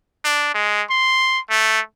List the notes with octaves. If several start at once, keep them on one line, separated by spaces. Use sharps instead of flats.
D4
G#3
C6
A3